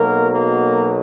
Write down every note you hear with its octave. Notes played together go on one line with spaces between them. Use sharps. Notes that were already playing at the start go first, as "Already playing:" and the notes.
Already playing: B1 B2 F#3 A#3 A#4
A#3 A#4